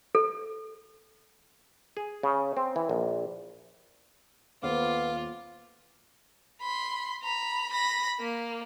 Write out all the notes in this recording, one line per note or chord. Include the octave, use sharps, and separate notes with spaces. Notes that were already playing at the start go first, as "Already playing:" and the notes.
A4
G#4
C#3
C4
E3
A#1
D#1 B3 F4 C5 F5 D6
B5 C6
A#5 B5
B5 A#6
A#3